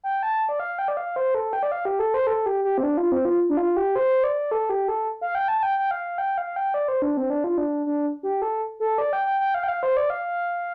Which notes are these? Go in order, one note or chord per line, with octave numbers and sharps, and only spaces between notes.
G5
A5
D5
F5
G5
D5
F5
C5
A4
G5
D5
F5
G4
A4
C5
A4
G4
G4
C4
D4
F4
C4
F4
D4
F4
G4
C5
D5
A4
G4
A4
F5
G5
A5
A5
G5
G5
F5
G5
F5
G5
D5
C5
D4
C4
D4
F4
D4
D4
G4
A4
A4
D5
G5
G5
G5
F5
G5
F5
C5
D5
F5